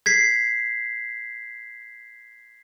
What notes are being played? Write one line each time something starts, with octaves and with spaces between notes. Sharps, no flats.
G#6 B6 C7